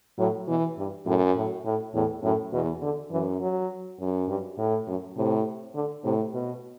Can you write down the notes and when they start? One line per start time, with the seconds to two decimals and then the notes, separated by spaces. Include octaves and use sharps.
0.19 A2 F#3
0.48 B2 E3
0.78 G2
1.06 F#2 A2
1.36 A2
1.65 A2
1.94 E2 A2
2.23 F#2 A2
2.53 E2 B2
2.82 D3
3.11 F#2 E3
3.41 F#3
4.00 F#2
4.28 G2
4.58 A2
4.87 F#2
5.16 A2 C3
5.75 D3
6.04 A2 C3
6.34 B2